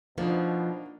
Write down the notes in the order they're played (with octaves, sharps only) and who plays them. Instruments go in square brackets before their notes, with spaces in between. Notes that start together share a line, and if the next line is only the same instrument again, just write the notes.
[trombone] B2 [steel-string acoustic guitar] F3 [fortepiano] A#3 D4 D#4